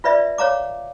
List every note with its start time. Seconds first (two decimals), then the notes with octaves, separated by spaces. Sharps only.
0.04 F4 B4 D5 E5
0.38 C#5 F5 A#5 D6